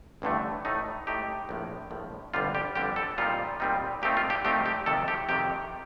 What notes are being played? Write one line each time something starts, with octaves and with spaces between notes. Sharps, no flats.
A1 G2 D3 A3
A2 A3 D#4
A2 A3 D#4 G4
A#1 A2 F3
A#1 A2 F3
G1 F2 D3 G3 D4 F4
G4
G1 F2 D3 G3 D4 G4
A4
A#2 G3 C4 D#4 F4
A#2 G3 C4 D#4
A#2 A3 C4 D#4 G4
F4
G4
A#2 A3 C4 D#4 G4
G4
F2 C3 D#3 A4
G4
F2 C3 D#3 G4